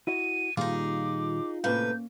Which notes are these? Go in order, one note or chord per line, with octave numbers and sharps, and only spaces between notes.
E4 F#4 D#5 D#7
A#2 D#3 G3 D#4 F4 G#4 D6
A2 C3 A#3 C#4 B4 F5 G6